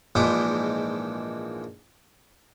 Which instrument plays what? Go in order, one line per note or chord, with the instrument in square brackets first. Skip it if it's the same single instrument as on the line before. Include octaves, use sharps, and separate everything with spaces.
[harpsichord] A#1 G#2 E3 F3 D6 D#6